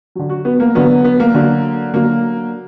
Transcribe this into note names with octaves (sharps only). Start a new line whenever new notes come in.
D3 F#3
F#4
B3
A#3
D3 F#3 B3
B3
A#3
D3 F#3
D3 F#3 A#3